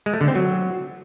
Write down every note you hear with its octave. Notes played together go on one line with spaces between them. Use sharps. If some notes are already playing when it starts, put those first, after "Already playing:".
G#3
A3
D3
C4
F#3